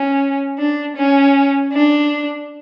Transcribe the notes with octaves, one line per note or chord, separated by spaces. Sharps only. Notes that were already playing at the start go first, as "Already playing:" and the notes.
Already playing: C#4
D4
C#4
D4